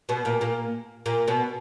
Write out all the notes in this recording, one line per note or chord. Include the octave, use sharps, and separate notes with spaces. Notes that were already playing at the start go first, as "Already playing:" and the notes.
B2 B3
A#2 A#3
A#2 A#3
A#2 A#3
B2 B3